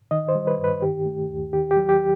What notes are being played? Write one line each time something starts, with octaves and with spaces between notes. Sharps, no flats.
D#3 D#5
C5
G3
B4
G2
B4
D#3 G4
A3
D#2
D#3 G4
G4
F#3
G4